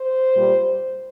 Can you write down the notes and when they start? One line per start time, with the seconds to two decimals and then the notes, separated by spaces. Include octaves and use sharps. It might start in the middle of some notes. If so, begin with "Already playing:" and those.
Already playing: C5
0.34 A#2 G3